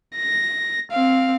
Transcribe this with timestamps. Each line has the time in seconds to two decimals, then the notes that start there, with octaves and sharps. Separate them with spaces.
0.16 A#6
0.91 C4 F5